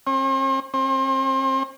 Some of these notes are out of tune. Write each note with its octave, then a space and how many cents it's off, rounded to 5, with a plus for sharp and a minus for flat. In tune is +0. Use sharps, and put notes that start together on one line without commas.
C4 +45
C4 +35